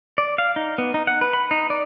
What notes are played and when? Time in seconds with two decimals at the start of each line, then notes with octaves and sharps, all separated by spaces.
0.18 D5
0.38 F5
0.56 D#4
0.78 B3
0.94 D#4
1.07 F#5
1.21 B4
1.33 B5
1.51 D#4
1.70 D5